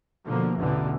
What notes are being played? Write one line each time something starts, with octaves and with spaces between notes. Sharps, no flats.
B2 D3 F3 A#3
A1 E2 B2 D3 E3